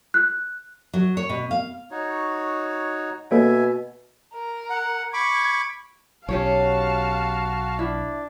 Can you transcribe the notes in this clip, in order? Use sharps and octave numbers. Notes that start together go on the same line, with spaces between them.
F#6
F#3
C#5
B2
F5
D#4 F#4 C#5
B2 A#3 A4 C#5 E5 G#5
A#4
F#5
B5 C#6 D6 G#6
B1 C#4 G4 C#5 F5 A5
F#4
D4 E4